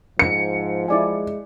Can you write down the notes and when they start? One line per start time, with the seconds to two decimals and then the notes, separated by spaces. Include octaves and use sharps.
0.19 G#2 F3 C#7
0.88 G#3 E4 D5 G#5